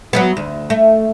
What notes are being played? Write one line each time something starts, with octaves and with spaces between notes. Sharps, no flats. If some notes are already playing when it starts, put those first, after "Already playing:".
F#3 A3 B3
D2
A3